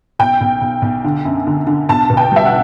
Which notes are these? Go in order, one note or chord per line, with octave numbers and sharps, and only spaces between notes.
B1 G5
B1
B1
B1
D3
F#2
D3
D3
B1 A5
B2
G5
G3 E5
F#5